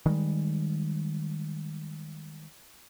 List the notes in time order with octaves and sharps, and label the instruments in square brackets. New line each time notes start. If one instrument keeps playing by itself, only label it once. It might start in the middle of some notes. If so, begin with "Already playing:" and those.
[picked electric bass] D#3 G3 G#3